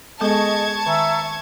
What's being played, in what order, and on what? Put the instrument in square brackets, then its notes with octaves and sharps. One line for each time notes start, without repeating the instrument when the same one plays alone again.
[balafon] G#3 B3 A4 [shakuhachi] G#4 [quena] D#5 [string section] A5 C#6 G#6
[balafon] D#3 G#5 [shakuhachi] E5 [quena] A#5